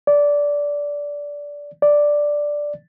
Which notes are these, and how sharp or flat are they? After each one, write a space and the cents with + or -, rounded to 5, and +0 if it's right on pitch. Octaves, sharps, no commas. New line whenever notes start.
D5 -15
D5 +0